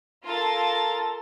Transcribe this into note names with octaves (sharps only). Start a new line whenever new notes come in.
F4 A4 A#4 A#5 A6